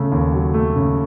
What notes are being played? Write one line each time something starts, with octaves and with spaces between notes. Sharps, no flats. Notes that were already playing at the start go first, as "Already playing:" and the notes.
Already playing: C#3 A3
D#2
F#3
A3
C#3